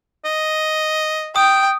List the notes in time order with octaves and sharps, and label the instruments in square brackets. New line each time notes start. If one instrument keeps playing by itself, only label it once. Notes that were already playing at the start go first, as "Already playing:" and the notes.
[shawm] D#5
[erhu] G5 [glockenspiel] D#6